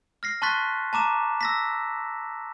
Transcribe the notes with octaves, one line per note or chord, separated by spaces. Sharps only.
F6 A#6 C7
A5 C6 C#6 F#6 A6 B6
A5 A#5 D6 E7
E6 A#6 B6